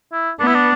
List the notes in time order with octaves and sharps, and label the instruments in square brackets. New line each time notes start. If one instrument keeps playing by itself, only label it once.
[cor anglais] E4
[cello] B3 [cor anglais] D4
[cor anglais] E4
D4